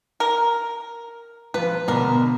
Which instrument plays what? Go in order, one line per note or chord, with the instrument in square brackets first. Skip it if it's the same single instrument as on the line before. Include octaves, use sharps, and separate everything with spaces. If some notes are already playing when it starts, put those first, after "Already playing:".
[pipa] A#4
[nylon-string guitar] F3 F4 [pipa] B4
[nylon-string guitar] B2 D3 [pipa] D4 A#4